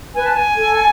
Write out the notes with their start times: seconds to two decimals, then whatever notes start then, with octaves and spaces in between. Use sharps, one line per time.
0.15 B4 G#5
0.26 A5
0.36 G#5
0.56 A4